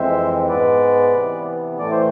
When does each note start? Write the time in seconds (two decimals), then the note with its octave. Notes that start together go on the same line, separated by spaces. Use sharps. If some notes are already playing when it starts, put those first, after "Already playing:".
Already playing: F2 E3 G#3 C4 C5 E5
0.48 G#2 G#3 B3 B4 D5
1.14 C3 E3 B3
1.79 A2 E3 A3 D5
1.91 C5